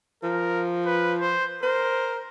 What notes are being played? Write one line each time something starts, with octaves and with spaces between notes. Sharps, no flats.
F3 A#4
B4
C5
A#4 C5